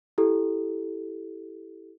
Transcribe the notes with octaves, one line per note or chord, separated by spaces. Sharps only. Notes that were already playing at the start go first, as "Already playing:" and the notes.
E4 G4 A4